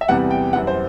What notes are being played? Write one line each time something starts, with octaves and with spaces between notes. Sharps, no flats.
E5
E2 C3 E3 G3 F#5
G5
F#2 E3 G3 F#5
C5